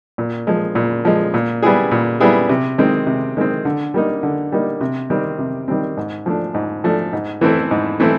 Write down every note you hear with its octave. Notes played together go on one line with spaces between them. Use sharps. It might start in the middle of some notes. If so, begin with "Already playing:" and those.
A#2
F3 G#3
A#2
F3 G#3
A#2
G3 B3 E4 G#4
A#2
G3 B3 E4 G#4
C3
D#3 G#3 C4
C3
D#3 G#3 C4
D3
G3 A#3 D#4
D3
G3 A#3 D#4
C3
D#3 G3 C4
C3
D#3 G3 C4
G#2
F3 A3 D4
G#2
F3 A3 D4
G#2
E3 A3 C4 E4
G#2
E3 A3 C4 E4